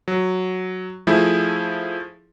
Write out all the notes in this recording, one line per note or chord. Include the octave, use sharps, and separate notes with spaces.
F#3
F3 A3 E4 G#4